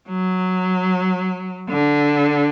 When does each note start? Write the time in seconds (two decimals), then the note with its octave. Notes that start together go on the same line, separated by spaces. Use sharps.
0.09 F#3
1.70 D3